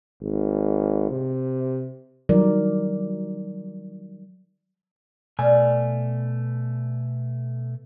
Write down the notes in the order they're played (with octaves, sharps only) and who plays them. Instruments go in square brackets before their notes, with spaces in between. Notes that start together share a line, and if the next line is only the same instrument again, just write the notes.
[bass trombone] G#1
C3
[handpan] D#3 F#3 G3 A#4 D5
[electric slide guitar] B2 A3 G#5 [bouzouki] D5 F5